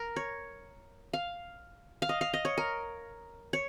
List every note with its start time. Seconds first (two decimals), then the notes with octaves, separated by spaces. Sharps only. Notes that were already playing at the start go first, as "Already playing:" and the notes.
Already playing: A#4
0.16 C#5
1.13 F5
2.02 F5
2.09 D#5
2.21 F5
2.34 D#5
2.45 C#5
2.58 A#4
3.53 C#5